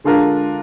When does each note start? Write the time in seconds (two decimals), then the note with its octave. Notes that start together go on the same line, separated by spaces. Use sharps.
0.04 D3 G#3 D4 F4 A#4